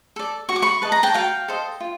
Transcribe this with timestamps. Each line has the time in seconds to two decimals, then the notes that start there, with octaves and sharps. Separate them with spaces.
0.16 A4 D5
0.49 F#4 C#6
0.56 D6
0.62 B5 C#6
0.82 B4 D#5 A5
0.92 A#5
1.03 G5 A5
1.14 F#4 F5 G5
1.48 A4 C5 D#5
1.81 F4